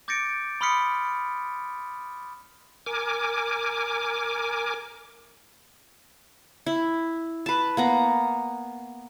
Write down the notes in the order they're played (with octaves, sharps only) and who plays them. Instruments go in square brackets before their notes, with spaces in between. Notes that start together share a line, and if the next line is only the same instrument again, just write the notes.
[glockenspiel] D6 G6 A6 A#6 C#7 D7
B5 C6 D#6 F6 B6 C#7
[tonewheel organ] A#4 G#5 D6
[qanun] E4
B4 A5
A#3 B3 A#5